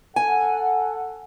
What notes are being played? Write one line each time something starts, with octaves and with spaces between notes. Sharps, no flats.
A4 F#5 G#5